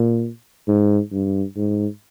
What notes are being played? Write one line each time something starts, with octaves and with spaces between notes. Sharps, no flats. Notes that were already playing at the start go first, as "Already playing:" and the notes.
Already playing: A#2
G#2
G2
G#2